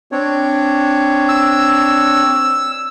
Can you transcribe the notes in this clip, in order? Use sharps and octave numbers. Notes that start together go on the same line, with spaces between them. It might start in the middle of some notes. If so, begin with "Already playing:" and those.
C4 D4 C#5
E6